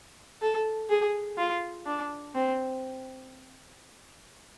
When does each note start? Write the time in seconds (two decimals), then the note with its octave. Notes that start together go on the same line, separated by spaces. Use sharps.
0.42 A4
0.90 G#4
1.38 F4
1.86 D4
2.35 C4